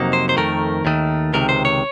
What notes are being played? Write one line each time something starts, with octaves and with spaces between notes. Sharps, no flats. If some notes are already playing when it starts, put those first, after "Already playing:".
Already playing: F2 C3 F#3 A#3 D#4
C5
C5
F2 D#3 A3 A#4
D#2 D#3 A3
C#2 C3 D#3 A#4
C5
C#5